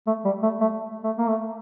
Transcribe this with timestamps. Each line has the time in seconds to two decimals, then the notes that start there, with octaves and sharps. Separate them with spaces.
0.07 A3
0.25 G3
0.43 A3
0.61 A3
1.04 A3
1.18 A#3
1.28 A3